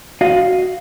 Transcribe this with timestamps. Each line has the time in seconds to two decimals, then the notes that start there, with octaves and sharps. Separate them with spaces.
0.21 F#4 D#5 F5